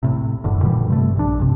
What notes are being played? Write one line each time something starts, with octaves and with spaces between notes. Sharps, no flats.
A2 C3
F1 F#2 A2 D3
A#2 D3 E3 G3
G2 C3 A3
A#1 D4
G2 C3